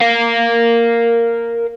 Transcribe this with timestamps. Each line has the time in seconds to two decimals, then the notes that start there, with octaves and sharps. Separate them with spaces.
0.01 A#4 F5